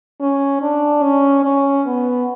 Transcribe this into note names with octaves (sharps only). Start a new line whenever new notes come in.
C#4
D4
C#4
C#4
B3